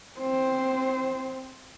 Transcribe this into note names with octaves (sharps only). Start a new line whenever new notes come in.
C4 C5